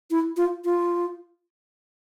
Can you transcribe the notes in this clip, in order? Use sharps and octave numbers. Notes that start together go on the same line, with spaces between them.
E4
F4
F4